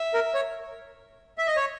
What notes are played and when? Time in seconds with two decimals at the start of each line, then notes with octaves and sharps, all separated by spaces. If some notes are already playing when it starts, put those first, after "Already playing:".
Already playing: E5
0.14 A#4
0.34 C#5
1.38 E5
1.47 D#5
1.56 C#5